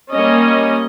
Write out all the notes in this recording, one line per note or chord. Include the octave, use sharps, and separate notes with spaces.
G3 A#3 C#4 D#5